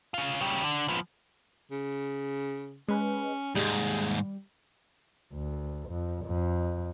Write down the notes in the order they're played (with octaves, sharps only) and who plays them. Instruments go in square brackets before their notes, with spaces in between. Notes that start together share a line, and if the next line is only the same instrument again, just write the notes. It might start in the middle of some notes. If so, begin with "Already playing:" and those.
[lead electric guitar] C#3 F4
C#3 G3
D3
F3 B3
[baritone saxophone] C#3
[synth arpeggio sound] G#3 B4 [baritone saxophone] C#4
[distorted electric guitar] D#2 G#2 [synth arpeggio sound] G3 [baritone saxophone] G#4
[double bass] D2
F2
F2